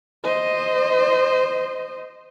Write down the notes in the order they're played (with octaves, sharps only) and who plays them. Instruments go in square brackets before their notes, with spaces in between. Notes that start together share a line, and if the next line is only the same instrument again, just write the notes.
[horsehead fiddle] C5 D#5